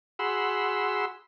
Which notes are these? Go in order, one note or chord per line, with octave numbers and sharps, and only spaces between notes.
F#4 G#4 F#5 B5 C6 E6